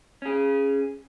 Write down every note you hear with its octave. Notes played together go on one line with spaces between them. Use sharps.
C#4 G#4